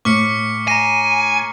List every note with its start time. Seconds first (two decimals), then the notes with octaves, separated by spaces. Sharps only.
0.05 A2 C#6 D6 F6 B6 C#7
0.68 G#5 A#5 A#6 C7